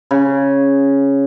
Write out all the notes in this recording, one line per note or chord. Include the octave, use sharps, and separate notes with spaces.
C#3